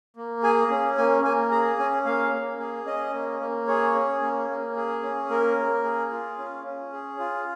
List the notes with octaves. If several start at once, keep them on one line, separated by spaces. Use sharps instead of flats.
A#3
G#4 G#5
C#4
A#3 G#5
A#3 G#5
G#4 A#5
C#4 G#5
A#3 F5
A#3
G#4
C#4 D#5
A#3
A#3
G#4 C#5
C#4
A#3
A#3
G#4
C#4
A#3 A#4
A#3
G#4
F4
C#4
C#4
G#4
F4